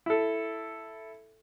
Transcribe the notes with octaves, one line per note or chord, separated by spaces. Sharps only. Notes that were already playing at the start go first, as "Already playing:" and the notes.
E4 A4